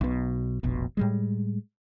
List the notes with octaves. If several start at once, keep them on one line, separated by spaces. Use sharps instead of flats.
B1 B2
F1 A#1 B2
A2 G3 G#3